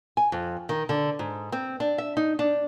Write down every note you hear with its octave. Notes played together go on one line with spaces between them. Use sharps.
G#5
F2
D#3
D3
G#2
C4
D4
E5
D#4
D4